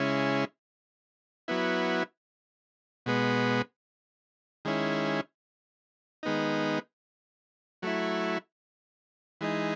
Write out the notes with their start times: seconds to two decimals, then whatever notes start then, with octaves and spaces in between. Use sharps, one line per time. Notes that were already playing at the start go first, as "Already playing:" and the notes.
Already playing: C#3 G#3 C#4 E4
1.48 F#3 B3 E4
3.06 B2 G#3 B3
4.65 D#3 G#3 C#4 E4
6.23 D#3 G#3 B3 D#4
7.82 F#3 A3 E4
9.41 E3 G#3 D#4